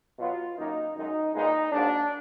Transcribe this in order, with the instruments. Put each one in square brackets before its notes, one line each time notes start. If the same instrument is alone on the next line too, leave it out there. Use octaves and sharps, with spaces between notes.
[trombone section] B2 F#3 B3 F4
F#2 D#3 A#3 D#4
F#2 D#3 G#3 D#4
A#2 G#3 B3 D#4
G#2 F#3 A#3 D4